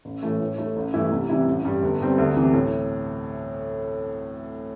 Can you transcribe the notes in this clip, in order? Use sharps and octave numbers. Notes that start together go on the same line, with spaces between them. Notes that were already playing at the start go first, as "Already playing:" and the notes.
A1
A2 E3 A3
A2
A3 E4 A4
A1
G2 E3 A3 E4
C2
C3 E3 G3 E4
A1
G2 G3
G1
G2 G3 C4
D2
C3 E3
A2